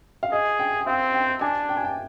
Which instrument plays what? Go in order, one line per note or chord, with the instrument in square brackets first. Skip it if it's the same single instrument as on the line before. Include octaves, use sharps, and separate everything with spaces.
[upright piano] F5
[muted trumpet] G#4 [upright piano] D#5
[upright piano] G5
G5
[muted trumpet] C4 [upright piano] F5
[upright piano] G5
[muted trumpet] D4 [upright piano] G#5
[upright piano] G5
G#5
G5